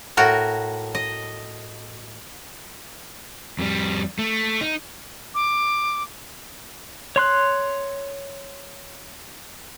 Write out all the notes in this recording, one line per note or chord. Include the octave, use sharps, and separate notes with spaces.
A2 F#4 A#4
D#5
F2 G3
A3
D#4
D6
C#5 C6 F#6